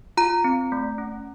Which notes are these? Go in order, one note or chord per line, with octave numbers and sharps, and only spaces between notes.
F4 A#5
C4
A3
C#4